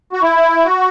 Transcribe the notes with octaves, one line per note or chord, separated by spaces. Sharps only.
F#4
E4
F#4